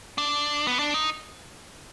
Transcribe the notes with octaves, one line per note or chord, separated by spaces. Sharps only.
D4
B3
D4
D#4